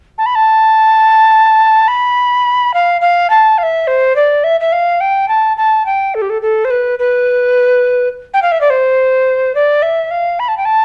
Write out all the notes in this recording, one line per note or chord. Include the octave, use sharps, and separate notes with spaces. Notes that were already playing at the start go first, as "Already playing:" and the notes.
A5
B5
A5
B5
F5
F5
A5
F5
E5
C5
D5
E5
E5
F5
G5
A5
A5
G5
A4
G4
A4
A4
C5
B4
B4
G5
F5
E5
D5
C5
D5
E5
F5
B5
A5
G5
A5